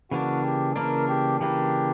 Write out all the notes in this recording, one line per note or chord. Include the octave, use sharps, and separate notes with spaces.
C#3 E3 A#3 D4 F#4
G4
C#3 E3 A#3 D4 A#4
G4
C#3 E3 A#3 D4 G4